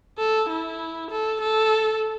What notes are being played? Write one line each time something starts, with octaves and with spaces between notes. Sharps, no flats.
A4
E4
A4
A4